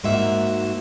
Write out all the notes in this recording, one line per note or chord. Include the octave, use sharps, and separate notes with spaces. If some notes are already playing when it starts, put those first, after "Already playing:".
G#2 A#3 F#4 E5